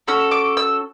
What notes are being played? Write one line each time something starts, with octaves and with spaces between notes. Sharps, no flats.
C#4 F#4 A4 E6
D6
E6